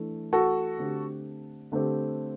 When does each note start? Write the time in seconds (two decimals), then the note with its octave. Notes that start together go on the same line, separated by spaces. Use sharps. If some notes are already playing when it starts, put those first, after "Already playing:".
Already playing: E3 A3 D4
0.33 F#4 A4
0.79 D3 A3 C4 G4
1.72 D3 A3 C4 G4